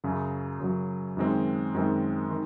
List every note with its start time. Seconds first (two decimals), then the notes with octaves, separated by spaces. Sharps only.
0.04 F#2 C#3 F#3
0.60 F#2 C#3 F#3
1.17 F#2 D#3 G#3 C4
1.74 F#2 D#3 G#3 C4
2.31 D#3